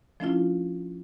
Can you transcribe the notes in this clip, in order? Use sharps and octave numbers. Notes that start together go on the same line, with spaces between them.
F3 A3 C#4 D4 E4 F4